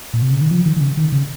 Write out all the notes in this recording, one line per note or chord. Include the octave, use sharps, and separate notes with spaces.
A#2
C3
C#3
D#3
F3
D#3
D#3
C#3
D#3
C#3